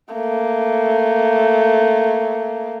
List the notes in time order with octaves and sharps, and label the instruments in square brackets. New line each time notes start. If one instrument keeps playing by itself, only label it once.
[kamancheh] A3 A#3